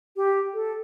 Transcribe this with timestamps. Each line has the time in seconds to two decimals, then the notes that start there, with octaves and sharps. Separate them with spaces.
0.16 G4
0.54 A4